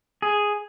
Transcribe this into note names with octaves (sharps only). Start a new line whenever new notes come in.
G#4